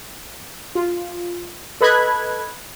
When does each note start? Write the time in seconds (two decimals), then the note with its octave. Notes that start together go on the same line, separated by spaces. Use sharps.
0.75 F4
1.81 A4 B4 D#5 B5 F#6 G#6